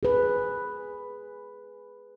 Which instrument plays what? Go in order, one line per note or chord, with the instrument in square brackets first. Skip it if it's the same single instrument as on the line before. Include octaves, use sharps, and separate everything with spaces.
[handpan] G#4 B4